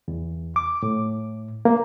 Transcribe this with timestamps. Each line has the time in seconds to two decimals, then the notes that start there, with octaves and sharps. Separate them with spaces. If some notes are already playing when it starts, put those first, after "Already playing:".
0.08 E2
0.56 D6
0.83 A2
1.65 A#3